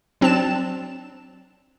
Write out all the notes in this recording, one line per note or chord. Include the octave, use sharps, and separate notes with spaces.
F#3 C4 D4 A5 E7